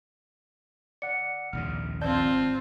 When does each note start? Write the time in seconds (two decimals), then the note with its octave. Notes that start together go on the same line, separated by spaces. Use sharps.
1.02 D5 F#5 C#7
1.53 A#1 D#2 C3 F6
2.01 G#1 C4 F4 D5 A5 G6